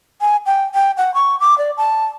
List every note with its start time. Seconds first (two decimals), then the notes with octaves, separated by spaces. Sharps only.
0.21 G#5
0.46 G5
0.74 G5
0.97 F#5
1.14 C#6
1.40 D6
1.58 D5
1.77 A5